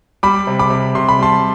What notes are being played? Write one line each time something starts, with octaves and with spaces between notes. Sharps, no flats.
G3 B5 D6
C3
B5 D6
C3
C3 C6
B5
G3 A5 C6